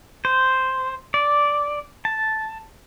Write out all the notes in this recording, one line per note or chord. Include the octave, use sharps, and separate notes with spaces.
C5
D5
A5